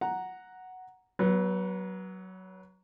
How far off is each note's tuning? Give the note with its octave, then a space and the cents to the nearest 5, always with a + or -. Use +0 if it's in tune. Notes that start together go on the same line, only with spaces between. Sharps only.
F#5 +0 A#5 +0
F#3 +15 B3 -25